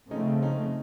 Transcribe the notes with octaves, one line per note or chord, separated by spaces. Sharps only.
C#3 F3 A3 C4 C#4 D#4
C#4 D#4